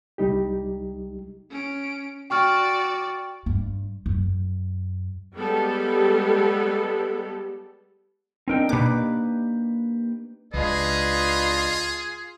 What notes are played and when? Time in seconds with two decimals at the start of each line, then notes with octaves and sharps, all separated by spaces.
0.18 C2 G3 D#4 G4
1.50 C#4 D7
2.30 F#4 D5 G5 C#6 F6
3.46 G2
4.06 F#2
5.37 G3 G#3 B3 G4 A4
8.48 C4 D4 D#4 A#4 G5
8.69 B2 A#3 G4 B4 D6
10.54 C#2 D4 F4 G#4 B4 D#5